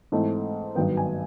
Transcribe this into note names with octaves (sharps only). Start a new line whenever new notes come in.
G#2 E3 A3 C4
G#1 G2 D#3 F#3 B3 G5
G#5